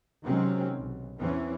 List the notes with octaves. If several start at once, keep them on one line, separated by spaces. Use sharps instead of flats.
C3 D#3 F#3 G#3 C4 C#4
B1
E2 E3 C4 C#4